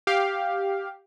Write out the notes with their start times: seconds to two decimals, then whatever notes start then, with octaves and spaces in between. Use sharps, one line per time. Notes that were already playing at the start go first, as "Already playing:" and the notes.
0.07 G4 F5